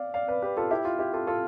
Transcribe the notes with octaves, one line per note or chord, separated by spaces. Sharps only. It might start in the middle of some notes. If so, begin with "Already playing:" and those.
Already playing: D5 F5
D5 F5
B4 D5
G4 B4
F4 A4
E4 G4
F4
E4 G4
F4 A4
F4 A4